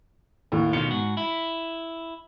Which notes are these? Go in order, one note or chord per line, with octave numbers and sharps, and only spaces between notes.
D#2 A2
B2 D#3 F4 C#7
G#2 F#4
E4